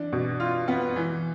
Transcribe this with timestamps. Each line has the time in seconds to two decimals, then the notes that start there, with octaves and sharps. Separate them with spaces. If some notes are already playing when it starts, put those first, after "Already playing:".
Already playing: E3 D4
0.12 B2
0.40 F4
0.68 B3
0.96 E3